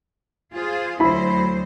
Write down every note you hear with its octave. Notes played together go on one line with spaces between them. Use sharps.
F4 G#4 C5
D2 F#3 E4 C5 B5